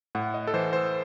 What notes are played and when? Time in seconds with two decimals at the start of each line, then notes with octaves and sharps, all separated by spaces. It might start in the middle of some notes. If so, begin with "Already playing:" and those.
0.15 A2 F#5
0.34 D#5
0.47 A4
0.54 E3 C5
0.73 C5